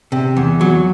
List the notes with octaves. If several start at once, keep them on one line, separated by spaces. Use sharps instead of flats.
C3
E2
F#3